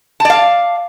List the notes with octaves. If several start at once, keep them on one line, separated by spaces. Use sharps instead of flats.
D5 F5 A5